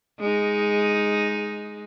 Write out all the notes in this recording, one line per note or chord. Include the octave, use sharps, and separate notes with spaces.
G#3 D#4